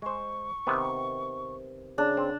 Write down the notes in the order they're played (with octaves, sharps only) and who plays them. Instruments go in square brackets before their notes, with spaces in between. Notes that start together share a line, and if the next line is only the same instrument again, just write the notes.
[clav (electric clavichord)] G#3 C5 [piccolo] C#6
[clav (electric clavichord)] C3 D#3 B3
[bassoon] C#3 [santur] D4
[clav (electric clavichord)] C4